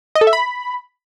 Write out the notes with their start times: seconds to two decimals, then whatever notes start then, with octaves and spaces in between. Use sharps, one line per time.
0.15 D#5
0.21 A4
0.27 E5
0.33 B5